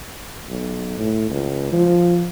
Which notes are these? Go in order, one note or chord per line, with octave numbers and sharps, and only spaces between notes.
B1
A2
C#2
F3